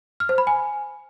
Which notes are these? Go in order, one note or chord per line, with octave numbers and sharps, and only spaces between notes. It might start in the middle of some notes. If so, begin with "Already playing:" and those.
F6
C5
B5
G#5